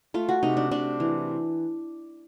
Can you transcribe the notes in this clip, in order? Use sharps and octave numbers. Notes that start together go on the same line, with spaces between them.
A3 F4
F#4
C3 D#4
D4
C3 D4
E3